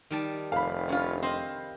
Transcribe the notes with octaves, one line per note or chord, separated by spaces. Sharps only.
D#3 G3 A5
F1 F5 B5
C#4 F4
C4 D#5